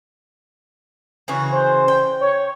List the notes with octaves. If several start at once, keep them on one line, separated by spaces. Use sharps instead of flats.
C#3 E3 F#4
C5
G5
C#5